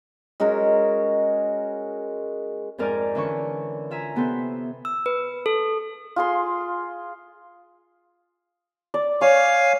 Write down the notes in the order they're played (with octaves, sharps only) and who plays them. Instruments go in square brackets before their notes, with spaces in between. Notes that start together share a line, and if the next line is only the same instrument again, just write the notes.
[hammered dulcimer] G#3 C#4 F#4 A#4
[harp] F2 G#2 A#4 D5 G#5 F6
D3 E3 C#4 C#6
F4 E5 G#5 A#5
C3 B3 A4 C5
[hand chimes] E6
B4
A4
[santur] F4 G#4 C6
D5
[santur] C#5 [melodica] F5 G#5